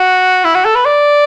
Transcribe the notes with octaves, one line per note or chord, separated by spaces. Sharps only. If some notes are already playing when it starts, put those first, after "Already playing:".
Already playing: F#4
E4
F#4
A4
B4
D5